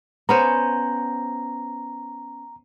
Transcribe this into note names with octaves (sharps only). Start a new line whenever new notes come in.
B3 C#4 C5 A#5